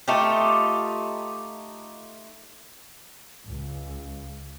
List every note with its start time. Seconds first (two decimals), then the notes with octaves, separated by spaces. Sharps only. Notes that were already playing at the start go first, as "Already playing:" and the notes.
0.08 A3 D#4 F4 G4
3.45 C#2